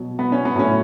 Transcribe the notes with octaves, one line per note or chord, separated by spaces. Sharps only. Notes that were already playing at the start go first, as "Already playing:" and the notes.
Already playing: B2 F#3
B3
C#4
B3
A2 F#3 A3 C#4